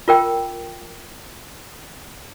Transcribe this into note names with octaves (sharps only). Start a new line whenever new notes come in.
F4 A#4 G5